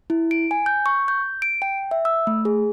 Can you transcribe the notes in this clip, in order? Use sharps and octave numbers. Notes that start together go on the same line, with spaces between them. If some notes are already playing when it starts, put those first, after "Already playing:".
E4
D7
G#5
G6
C#6
G6
D7
G5
E5
E6
A3
G#4